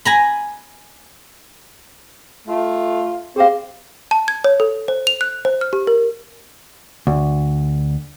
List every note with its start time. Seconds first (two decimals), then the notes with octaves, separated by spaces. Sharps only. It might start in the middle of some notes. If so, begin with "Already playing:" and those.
0.05 G#5 A#5 B5
2.47 A3 F4
3.36 C4 G4 G#4 C5 F5
4.11 A5
4.28 G#6
4.44 C#5
4.60 A4
4.88 C5
5.07 F7
5.21 F#6
5.45 C5
5.61 F6
5.73 G4
5.87 A#4
7.07 D2